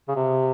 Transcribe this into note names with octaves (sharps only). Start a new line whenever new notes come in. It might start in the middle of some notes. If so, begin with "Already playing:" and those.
C#3
C3